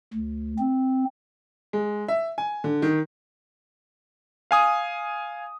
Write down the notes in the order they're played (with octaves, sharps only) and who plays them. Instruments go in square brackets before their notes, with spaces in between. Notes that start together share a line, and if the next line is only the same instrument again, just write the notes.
[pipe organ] D2
C4
[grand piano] G#3
E5
G#5
D3
D#3
[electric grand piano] F5 G#5 D#6